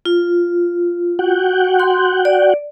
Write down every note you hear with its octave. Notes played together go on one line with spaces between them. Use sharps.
F4
F#4 F#5 G5
C6
D5